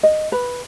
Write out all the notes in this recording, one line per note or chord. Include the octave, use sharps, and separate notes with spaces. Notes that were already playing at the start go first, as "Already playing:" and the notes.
D#5
B4